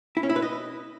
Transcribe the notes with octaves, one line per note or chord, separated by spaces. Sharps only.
E4
C#4
E4
B4
D#5